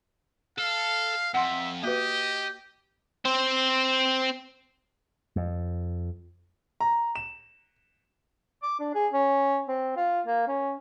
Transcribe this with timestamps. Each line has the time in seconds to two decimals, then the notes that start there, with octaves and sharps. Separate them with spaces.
0.58 A4 F5
1.34 F2 E5 F#5 C6
1.83 A#3 F#4 G4 B4 D#5
3.25 C4 C5
5.36 F2
6.80 A#5
7.16 E7
8.63 D6
8.80 D4
8.95 G#4
9.13 C#4
9.68 C4
9.96 F4
10.26 A#3
10.48 C#4